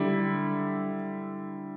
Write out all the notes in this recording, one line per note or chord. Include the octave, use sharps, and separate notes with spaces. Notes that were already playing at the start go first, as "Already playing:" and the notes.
Already playing: D3 G3 E4